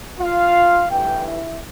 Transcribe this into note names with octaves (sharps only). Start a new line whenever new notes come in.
F4 F5
G2 E3 A3 G4 G5
E4 E5